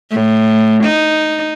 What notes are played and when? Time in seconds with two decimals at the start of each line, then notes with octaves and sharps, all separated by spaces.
0.11 A2
0.84 D#4